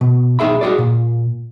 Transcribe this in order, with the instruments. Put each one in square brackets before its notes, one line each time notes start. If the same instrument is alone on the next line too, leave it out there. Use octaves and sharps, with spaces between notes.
[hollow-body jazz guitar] B2
B1 D#4 G#4 E5 B5
F#4 G#4 D5
A#2